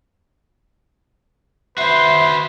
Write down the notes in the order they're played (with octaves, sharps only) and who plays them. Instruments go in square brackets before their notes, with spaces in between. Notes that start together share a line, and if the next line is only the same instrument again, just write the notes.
[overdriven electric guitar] F#4 C5 [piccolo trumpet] B4 [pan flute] E5 [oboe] C6